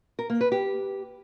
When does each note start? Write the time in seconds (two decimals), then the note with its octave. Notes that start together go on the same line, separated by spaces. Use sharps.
0.19 A#4
0.30 A#3
0.41 B4
0.52 G4